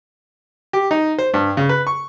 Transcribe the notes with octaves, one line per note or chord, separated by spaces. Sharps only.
G4
D#4
C5
G2
C#3
B4
C#6